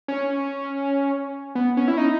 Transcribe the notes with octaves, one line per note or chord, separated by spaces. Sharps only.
C#4
B3
C#4
E4
D#4